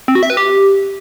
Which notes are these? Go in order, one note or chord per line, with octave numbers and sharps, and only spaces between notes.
C4
F#4
E5
B4
G4